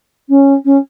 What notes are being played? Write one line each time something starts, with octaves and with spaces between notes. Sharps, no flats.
C#4
C#4